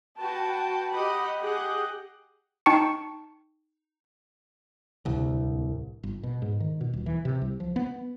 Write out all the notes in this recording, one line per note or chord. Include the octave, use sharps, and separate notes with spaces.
F#4 B4 G5 A5
G4 D#5 F#5 B5
G4 G#4 D#5 F#5
D#4 G5 A5 C#6 C#7
D1 C2
G1
B2
G#2
D#3
B2
D#1
E3
C3
C2
F3
B3